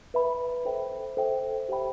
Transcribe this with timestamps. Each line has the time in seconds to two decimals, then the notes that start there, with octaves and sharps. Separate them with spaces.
0.14 B4 E5 B5
0.65 A4 C5 E5 G5
1.17 A4 C5 E5 G5
1.69 G4 C5 E5 G5 B5